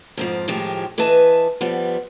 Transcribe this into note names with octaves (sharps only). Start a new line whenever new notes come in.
F2 G#2 F3
A2 D#3 F3 G#3 G4
E3 B4 D#5 E5 A5
F3 G3 B3